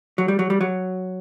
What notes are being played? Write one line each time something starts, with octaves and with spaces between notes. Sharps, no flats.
F#3
G3
F#3
G3
F#3